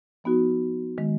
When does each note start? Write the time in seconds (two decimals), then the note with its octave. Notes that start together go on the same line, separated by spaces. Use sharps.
0.24 F3 B3 D#4 F#4
0.98 D#3 G#3